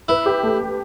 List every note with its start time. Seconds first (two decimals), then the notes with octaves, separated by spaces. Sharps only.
0.08 E4 B4
0.26 G4
0.43 A3
0.60 A3